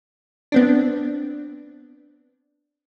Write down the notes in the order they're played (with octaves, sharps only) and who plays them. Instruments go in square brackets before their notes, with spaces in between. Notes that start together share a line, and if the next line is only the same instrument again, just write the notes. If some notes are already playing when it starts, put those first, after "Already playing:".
[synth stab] B3 C4 D4